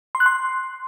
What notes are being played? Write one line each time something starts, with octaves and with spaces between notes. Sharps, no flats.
C6
F#6
C6